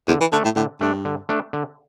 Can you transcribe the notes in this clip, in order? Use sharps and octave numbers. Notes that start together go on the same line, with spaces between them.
E2 D3
E3
D3 A3 D4
A2
A2 D3
G2 A3 D4
D3
A3 D4
D3